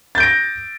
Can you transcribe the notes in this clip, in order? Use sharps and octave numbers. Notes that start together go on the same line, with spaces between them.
G6 A6 A#6 D7